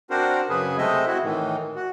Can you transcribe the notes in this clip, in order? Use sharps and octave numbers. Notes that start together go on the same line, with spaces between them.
C4 D4 F#4 A#4 C5
F#2 C#3 G#4 B4
C3 G#3 A3 C4 D#5 E5
C4 E4 F#4
A2 D#3 E3
F#4